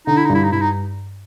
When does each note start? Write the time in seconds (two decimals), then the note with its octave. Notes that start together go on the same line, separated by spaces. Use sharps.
0.07 D3 D#4
0.17 E4
0.25 D#4
0.29 G2
0.35 E4
0.44 D#4
0.52 G2 E4
0.61 D#4